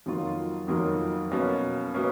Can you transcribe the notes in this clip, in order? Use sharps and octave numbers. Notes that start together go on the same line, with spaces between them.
F2 D#3 F#3 A#3 F4
F2 D#3 F#3 A#3 F4
B2 A#3 C#4
B2 A#3 C#4